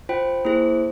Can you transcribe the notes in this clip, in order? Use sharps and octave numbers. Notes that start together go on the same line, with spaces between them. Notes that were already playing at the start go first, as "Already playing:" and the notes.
F4 C5 G5
A#3 E4 G#4 C5